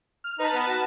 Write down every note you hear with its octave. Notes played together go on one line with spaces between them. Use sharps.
F6
D#4 B4 A5
B3
F#4